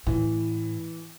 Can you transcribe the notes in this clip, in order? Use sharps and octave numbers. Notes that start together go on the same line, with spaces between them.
A2 E3